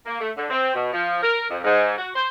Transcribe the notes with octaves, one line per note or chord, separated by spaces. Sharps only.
A#3
A3
D3
C4
B2
F3
A#4
F2
G#2
F#4
C5